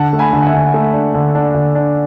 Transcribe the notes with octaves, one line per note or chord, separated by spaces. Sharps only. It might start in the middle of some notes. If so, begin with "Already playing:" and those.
Already playing: D3 F#5 A5
A3
G#5 B5
D3
F#5
E5 G#5
D3
A3
D4
D3
D4
D3
D4